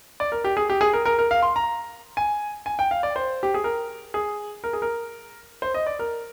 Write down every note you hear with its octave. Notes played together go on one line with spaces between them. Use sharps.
D5
A#4
G4
G#4
G4
G#4
A#4
A#4
A#4
F5
C6
A#5
G#5
G#5
G5
F5
D5
C5
G4
G#4
A#4
G#4
A#4
G#4
A#4
C5
D#5
D5
A#4